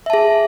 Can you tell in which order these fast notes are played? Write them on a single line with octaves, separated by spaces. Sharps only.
E5 A5 G#4